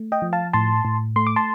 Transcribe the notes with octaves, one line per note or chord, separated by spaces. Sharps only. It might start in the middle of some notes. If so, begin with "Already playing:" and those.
Already playing: A3
D#5 G5
F3
F5 A5
A2 A5 C6
A2
A3 C6
D6
A5 C6